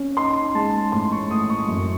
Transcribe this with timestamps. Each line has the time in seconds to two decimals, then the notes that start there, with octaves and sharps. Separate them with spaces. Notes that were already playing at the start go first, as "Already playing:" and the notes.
Already playing: C#4
0.17 D#4 C6
0.55 G#3 A5
0.92 A2 C6
1.12 C#6
1.31 A2 D#6
1.50 C#6
1.68 F#2